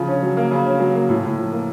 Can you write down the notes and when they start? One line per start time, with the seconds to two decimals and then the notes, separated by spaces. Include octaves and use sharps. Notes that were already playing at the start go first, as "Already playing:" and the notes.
Already playing: C#3 F3
0.08 C#4
0.22 F#3
0.37 A#3
0.51 C#3
0.66 C#4
0.80 F#3
0.95 A#3
1.09 A2
1.24 A2
1.38 F3
1.52 A#3